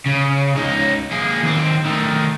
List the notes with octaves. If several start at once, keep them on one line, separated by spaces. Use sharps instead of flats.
C#3
C#2 D#4
A#3 G#4
D#2 C4
D#3 A3